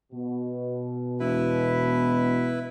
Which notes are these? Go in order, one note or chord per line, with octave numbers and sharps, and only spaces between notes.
B2
E1 E4 B4